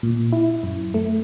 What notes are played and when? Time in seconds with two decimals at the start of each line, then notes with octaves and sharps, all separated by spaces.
0.03 A#2
0.33 E4
0.63 F#2
0.94 A3